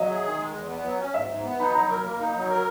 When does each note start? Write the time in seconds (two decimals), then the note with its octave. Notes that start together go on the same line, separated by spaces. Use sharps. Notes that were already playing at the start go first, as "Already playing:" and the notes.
Already playing: F#3 D#5 E5
0.09 G#4
0.25 D#3
0.38 G#3
0.55 E2
0.69 B3
0.85 F#3
0.99 C#4
1.14 G#2 E5
1.29 G#2
1.44 B3
1.60 D#4 B5
1.70 B5
1.75 F#3 A#5
1.89 A#4
2.04 A#3
2.19 D#4
2.34 F#3
2.49 A#4